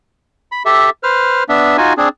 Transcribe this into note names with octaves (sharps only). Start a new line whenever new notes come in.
B5
G4 A4 E5
B4 C5 F6
B3 D4 E5
D#4 F4 F#4 G#5
C4 D4 G#4